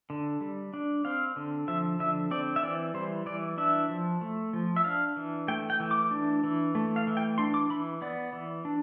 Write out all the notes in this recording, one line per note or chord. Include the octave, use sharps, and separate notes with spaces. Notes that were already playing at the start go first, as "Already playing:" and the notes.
D3
G3
D4
C4 F5
D3
F3 E5
D3 E5
C4 D5
E5
E3 D5
G3 C5
E3 D5
D4 E5
F3
A3
F3
E5
D4 F5
E3
A3 G5
G5
E3
D6
D4
E3
A3
F5
E3
G5
D4 C6
D6
E3 B5
B3 D5
E3
D4